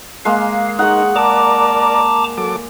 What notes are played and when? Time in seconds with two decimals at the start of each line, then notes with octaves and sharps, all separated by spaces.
0.25 G#3 A#3 F5
0.79 D#4 G#4 A#4 F#5 C#6
1.15 A#4 D5 A5 A#5 D6
2.38 F#3 A4 D6